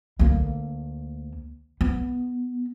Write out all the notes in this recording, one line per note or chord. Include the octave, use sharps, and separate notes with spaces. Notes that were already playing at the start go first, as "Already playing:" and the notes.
D2 A#3
B3